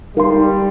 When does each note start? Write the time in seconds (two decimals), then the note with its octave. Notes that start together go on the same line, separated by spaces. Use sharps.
0.16 G3 D#4 A#4 F5 C6